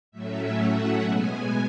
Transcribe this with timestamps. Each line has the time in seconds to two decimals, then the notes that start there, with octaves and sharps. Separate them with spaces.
0.11 A2 F#3 A3 C#4 E5
0.57 F#5
1.02 B2 G#3 B3 G#5